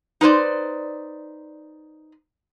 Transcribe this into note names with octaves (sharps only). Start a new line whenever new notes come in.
D#4 B4 C5 D5